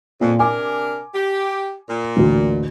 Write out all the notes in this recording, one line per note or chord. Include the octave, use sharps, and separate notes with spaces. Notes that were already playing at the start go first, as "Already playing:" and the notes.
F2 A#2
C3 D4 A#4 G#5 D6
G4
A#2
A1 D2